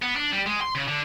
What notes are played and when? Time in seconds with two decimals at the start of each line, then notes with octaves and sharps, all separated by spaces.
0.02 B3
0.16 D4
0.33 G3
0.46 G#3
0.61 C6
0.75 C#3
0.88 D3